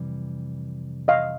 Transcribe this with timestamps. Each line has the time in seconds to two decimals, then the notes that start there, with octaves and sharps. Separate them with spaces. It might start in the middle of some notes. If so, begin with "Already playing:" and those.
Already playing: F2 C3 E3 G3
1.08 D#5 F5